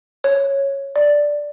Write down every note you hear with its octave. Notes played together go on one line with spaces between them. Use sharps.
C#5
D5